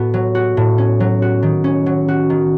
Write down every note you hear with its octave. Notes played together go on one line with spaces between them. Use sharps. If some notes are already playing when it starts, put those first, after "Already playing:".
Already playing: A2 B3 F#4
F#3
F#4
A2
C#4
F#3
F#4
D#3
C#4
F#3
F#4
D#3